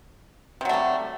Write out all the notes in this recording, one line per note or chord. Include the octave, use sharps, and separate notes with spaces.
C3 F#3 G3 A3